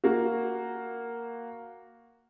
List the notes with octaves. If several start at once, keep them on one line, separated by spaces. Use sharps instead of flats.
A#3 F#4